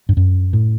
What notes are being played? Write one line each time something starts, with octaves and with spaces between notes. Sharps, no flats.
G2
F#2
A2